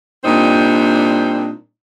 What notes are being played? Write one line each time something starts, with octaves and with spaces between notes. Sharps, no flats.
A#2 G3 C4 D4 D#4